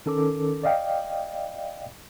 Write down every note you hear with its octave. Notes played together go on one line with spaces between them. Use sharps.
D#3 C#4 A4 A#4 D6
D5 D#5 F5 G5